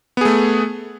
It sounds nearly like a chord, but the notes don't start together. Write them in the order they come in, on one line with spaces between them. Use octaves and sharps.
B3 G#4 A3